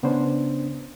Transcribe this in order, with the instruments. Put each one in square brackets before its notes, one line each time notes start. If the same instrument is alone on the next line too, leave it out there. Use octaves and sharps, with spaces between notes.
[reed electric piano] C#3 B3 C#4 D4 C5